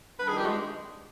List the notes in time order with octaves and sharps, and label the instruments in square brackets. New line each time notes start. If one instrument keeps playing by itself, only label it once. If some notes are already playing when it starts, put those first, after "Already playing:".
[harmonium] F2 D#3 G3 D4 [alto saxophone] B4
[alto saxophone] G#4
G4
G#3